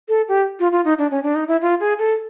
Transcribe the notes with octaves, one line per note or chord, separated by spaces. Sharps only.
A4
G4
F4
F4
D#4
D4
C#4
D4
D#4
E4
F4
G#4
A4